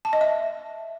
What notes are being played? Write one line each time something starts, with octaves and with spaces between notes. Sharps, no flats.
A5
D#5
E5